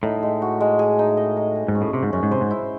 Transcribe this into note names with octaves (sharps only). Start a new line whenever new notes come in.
A2 D#4
G#3
F#4
G#3
G#4
D#4
D#5
D#4
G#4
G#2
C#4
A2
C3 D#5
G#2
F#2 C#4
G#2
C3 C5
G#2
E4